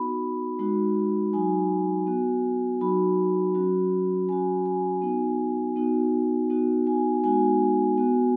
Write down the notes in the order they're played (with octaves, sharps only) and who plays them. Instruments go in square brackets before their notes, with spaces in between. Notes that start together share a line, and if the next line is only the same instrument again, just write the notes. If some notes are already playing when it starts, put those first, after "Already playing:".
Already playing: [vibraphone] B3 D#4 F#4 B5
G#3 D#4 F#4
F#3 D#4 F#4 G#5
B3 F#4
F#3 D#4 F#4 B5
F#3 C#4 F#4
F#3 C#4 F#4 G#5
G#5
B3 D#4 F#4
B3 D#4 F#4
B3 D#4 F#4
G#5
G#3 B3 D#4 F#4 G#5
B3 F#4